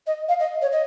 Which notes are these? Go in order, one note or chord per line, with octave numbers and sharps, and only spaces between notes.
D#5
F5
D#5
C#5
D#5